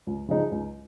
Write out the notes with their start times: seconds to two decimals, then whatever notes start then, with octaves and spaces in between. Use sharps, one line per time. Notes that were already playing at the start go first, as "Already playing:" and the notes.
0.07 C#2
0.28 C#3 F3 G#3 D#4
0.51 C#2